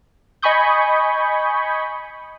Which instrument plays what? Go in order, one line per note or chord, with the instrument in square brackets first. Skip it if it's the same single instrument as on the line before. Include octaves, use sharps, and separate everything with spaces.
[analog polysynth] D#5 G#5 B5 C#6 D#6 G6